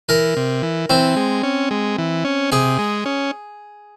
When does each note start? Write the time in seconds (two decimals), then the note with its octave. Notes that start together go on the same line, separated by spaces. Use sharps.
0.09 E3 A#4
0.37 C3
0.63 E3
0.90 E3 C4
1.16 G#3
1.43 C#4
1.71 G#3
1.98 E3
2.25 C#4
2.52 C3 G#4
2.79 G#3
3.06 C#4